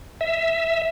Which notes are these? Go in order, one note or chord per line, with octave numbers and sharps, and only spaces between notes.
E5